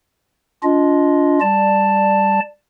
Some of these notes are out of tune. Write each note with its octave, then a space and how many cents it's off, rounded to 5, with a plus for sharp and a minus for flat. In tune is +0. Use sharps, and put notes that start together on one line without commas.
D4 -30 F4 +0 D#5 +5
G3 +10 D5 +5 A5 +0